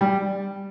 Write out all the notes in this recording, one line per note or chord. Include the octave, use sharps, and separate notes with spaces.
G3